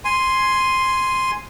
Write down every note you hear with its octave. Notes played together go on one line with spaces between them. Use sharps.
G#5 C6